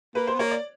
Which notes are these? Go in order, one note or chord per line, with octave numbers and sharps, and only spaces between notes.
A#3 B4
C5
B3
A#3 C#5
D5